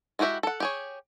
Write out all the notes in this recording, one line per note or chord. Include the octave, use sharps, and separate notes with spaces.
G#3 E4 F#4 G4 E5
A4 F#5
G4 G#4 C#5